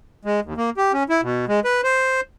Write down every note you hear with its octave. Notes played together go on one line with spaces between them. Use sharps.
G#3
D#2
A#3
G4
C#4
E4
B2
G#3
B4
C5